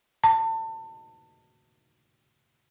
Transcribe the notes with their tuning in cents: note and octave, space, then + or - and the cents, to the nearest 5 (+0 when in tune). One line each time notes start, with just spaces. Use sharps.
A5 +30